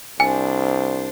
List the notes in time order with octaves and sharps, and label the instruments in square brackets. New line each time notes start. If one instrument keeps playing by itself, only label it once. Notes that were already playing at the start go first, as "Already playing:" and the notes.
[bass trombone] C2 [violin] D4 C5 [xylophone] G#5